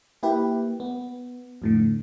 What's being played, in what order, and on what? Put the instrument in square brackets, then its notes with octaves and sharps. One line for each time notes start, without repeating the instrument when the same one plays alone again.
[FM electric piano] A#3 E4 G4 B4
B3
F2 A2 D3